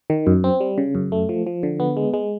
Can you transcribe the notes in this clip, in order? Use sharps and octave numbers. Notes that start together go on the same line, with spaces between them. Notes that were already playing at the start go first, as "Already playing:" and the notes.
D#3
F#2
C4
G3
C#3
F#2
A3
F3
F3
D3
B3
G#3
G#3